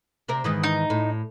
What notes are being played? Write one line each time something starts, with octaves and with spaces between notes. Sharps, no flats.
C3 C4 A#4
G#2 D#3 E3
D#4
A2